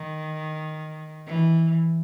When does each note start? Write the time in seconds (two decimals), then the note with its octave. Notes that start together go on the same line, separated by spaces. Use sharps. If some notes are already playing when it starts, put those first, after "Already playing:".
Already playing: D#3
1.27 E3